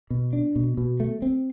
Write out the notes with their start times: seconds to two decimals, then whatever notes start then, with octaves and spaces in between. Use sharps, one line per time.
0.10 B2
0.33 D4
0.56 B2
0.77 B2
1.00 A3
1.22 C4